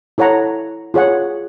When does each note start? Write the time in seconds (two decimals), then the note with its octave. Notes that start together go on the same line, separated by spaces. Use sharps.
0.18 E4 A4 C#5 F#5 A#5
0.94 F4 G#4 C#5 F#5